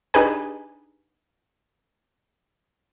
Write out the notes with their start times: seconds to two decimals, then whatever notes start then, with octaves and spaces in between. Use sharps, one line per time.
0.14 D4 D#4 G4 G#4 B4 G#5